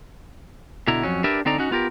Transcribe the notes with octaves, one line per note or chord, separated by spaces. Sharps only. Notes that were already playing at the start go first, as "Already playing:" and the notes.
B2 D3 E4 A#5
F2 F#3 C#4
D4 G4 A#4 B4 D5 E5
D3 C4 D#4 A4 D5 A#5
C#4 D#4 F#4 F#5
B3 F4 G4 A#4